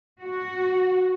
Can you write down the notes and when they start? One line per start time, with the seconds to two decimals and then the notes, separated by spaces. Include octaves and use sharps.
0.21 F#4